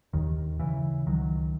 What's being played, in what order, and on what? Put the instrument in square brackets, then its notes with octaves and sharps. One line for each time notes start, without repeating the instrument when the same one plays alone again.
[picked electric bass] D#2 D#3
C#3 E3
C#2 D#3 F#3